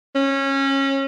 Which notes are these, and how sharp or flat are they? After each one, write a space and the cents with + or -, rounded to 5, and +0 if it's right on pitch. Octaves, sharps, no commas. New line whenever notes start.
C#4 -20